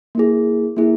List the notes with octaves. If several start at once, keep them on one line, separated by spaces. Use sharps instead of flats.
A#3 E4 G#4
A#3 E4 G#4